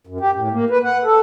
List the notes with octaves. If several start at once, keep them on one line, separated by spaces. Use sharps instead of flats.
F#2
G4
A2
A#3
B4
F#5
A4